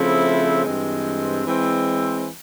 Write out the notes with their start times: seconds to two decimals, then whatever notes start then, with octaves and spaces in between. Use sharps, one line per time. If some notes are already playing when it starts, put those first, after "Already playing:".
Already playing: C#3 F3 A3 C4 E4
0.65 G2 E3 G#3 C4
1.46 E3 G#3 C4